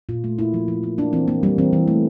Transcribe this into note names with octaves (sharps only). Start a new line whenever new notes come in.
A#2 F4
A3
A#3 E4
F3
F3
A#3
A#3 D4
E3 C4
A#3
G3 A#3
E3 C4
E3
A3